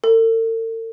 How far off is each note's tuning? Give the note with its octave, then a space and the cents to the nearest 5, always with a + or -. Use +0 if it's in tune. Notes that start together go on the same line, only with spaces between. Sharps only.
A4 +45